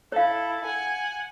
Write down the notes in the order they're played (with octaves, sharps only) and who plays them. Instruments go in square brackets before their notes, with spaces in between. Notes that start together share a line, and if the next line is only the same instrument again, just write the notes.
[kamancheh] E4 A4 [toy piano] C#5 F5
[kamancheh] F#5 G#5